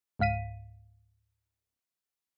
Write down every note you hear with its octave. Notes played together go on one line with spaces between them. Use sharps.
C#2 G#2 F5 B6 D#7